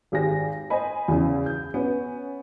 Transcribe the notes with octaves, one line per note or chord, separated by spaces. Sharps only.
G#1 G4 G#4 A#6
C5 D#5 G#5 B5
E2 C#3
G6
B3 C#4